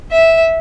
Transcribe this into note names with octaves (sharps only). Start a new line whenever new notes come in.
E5